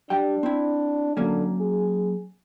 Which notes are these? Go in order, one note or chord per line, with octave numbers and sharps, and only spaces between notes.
G3 D4 G5
C4 E4
D3 F#3 A#3 C#4
G#4